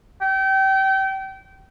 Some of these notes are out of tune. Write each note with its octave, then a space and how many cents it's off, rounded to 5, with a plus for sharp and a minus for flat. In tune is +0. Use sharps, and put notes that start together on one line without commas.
G5 -30